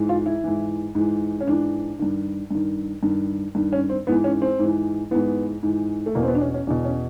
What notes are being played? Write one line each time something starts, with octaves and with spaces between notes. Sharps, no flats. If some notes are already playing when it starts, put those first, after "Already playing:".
Already playing: G#2 E3
F4
E4
G#2 E3
G#2 E3
C#4
G#2 E3 D4
G2 D#3
G2 D#3
G2 D#3
G2 D#3
C#4
C4
G#2 E3 B3
C#4
C4
G#2 E3
G#2 E3 B3
G#2 E3
A3
E2 B2 A#3
C4
B3
D4
C#4
C#4
E2 B2 D4
C#4